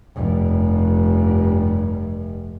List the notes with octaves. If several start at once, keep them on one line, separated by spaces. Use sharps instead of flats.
F1 G2